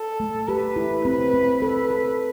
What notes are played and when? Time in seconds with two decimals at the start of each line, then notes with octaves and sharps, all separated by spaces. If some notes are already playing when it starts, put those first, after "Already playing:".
Already playing: A4
0.20 A3
0.48 G4 B4
0.76 E4
1.05 C4 B4
1.34 C4
1.62 A4 B4
1.90 A4